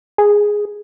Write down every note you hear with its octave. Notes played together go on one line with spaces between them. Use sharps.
G#4